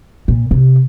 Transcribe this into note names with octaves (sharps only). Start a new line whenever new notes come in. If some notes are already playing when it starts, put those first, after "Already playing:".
A#2
C3